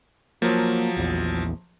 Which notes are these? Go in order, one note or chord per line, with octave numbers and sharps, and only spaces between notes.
F3 F#3 A#3
A#1 E2